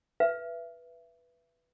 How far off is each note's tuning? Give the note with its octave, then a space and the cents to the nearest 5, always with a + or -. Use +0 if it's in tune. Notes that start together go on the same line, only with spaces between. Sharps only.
B4 -5 E5 +25